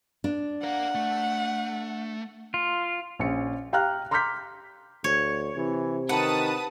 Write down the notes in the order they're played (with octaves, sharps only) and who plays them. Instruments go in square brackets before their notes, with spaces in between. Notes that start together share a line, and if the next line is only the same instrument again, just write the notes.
[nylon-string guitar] D4
[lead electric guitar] A#4 F5 [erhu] F#5
[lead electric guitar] A3
[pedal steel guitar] F4
[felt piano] A#1 C#4 C#7
G4 F5 G5 A#5 F6 F#6
A#5 C6 D6 F6 G6 B6
[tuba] D2 [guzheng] C#5
[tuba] C3 [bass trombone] E3
[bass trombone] D#3 [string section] B4 A5 D#6 [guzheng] F#5